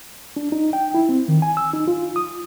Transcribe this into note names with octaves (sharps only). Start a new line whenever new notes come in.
D4
D#4
G5
E4
C4
D#3
G#5
E6
D#4
F4
D#6